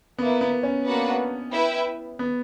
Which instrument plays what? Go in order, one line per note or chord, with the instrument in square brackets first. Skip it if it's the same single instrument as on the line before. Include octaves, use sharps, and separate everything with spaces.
[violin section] A#3 E4 B4 [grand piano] B3
[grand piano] B3
C#4
[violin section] A#3 D4 F#4 B4 F#5
E4 B4 E5 G5
[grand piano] B3